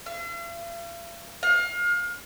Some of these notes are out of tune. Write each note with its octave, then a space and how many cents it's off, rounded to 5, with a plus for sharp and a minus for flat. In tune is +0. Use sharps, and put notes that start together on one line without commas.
F5 -45
F5 +30